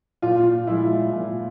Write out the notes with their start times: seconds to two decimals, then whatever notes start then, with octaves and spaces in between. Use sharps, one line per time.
0.22 A#2 F4
0.67 F3 G#3 E4
1.13 A#2